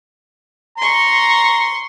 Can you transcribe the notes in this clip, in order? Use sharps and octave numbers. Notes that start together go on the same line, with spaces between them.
A#5 C6 C#6